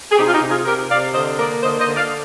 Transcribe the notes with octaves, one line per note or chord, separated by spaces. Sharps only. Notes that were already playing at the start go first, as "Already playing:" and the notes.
G#4
C3 D#4 G4
F4
D#4 G4
C3
F4 G#4
C3 G4 A#4
C3 D5 F5
D3 C5 D#5
A#3 A#4 D5
D3 C5 D#5
C5 D#5
D3
D5 F5